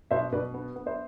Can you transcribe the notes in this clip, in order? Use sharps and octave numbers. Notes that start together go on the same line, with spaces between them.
B2 C5 E5
B2 B4 D5
B3
B3
C5 E5